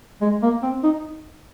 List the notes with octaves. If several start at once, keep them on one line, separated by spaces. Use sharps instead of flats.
G#3
A#3
C4
D#4